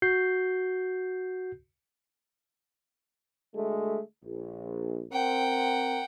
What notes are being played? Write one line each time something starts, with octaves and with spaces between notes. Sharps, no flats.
F#4 G6 C7
D2 G#3 A3
A#1
C4 A#4 F#5 G5